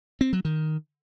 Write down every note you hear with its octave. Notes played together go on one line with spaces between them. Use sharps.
C4
F#3
D#3